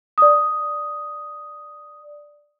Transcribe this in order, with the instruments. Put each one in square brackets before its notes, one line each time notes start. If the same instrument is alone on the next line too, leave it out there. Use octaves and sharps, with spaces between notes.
[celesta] D5 D#6